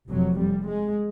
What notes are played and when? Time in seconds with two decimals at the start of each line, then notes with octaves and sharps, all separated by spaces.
0.09 F1 F2 C3 F#3
0.37 G3
0.66 G#3